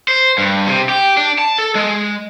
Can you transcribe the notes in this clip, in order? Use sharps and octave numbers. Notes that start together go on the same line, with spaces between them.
C5
G2
C3
G4
D4
A5
A4
G#3